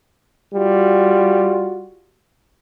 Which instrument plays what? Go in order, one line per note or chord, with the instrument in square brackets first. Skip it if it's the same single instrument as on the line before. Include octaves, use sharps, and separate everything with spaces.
[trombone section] G3 F4 F#4